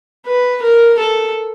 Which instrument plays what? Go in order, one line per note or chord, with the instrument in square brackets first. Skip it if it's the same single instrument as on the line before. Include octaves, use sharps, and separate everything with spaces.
[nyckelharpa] B4
A#4
A4